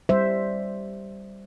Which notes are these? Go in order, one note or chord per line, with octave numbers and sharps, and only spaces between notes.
G3 C5 E5